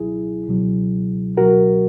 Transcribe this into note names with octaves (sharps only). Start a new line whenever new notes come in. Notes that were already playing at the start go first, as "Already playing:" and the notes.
Already playing: C#2 B2 F#3 E4 G#4
C#2 B2 F#3
C#2 B2 F#3 F#4 A#4